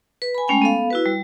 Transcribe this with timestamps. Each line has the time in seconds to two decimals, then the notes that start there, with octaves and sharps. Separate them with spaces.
0.22 B4
0.35 G#5 B5
0.48 G#3 A3 C#4 G5 G#5
0.62 B3 A4 F5
0.91 E4 F#4 B4
1.06 G3